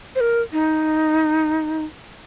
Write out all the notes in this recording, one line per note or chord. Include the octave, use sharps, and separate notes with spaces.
C5
A#4
D#4